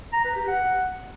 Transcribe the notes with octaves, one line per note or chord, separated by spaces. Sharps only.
A#5
B4
G4
F#5